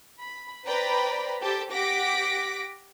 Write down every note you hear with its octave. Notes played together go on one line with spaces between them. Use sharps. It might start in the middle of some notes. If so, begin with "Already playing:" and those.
B5
B4 C5 D5 G5 A#5 B5
G4 A4 C5 G5 A5
G4 F#5 D6 A#6 B6 D7